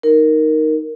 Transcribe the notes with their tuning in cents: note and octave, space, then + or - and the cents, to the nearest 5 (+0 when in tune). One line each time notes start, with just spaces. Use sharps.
D#4 +0 A#4 +0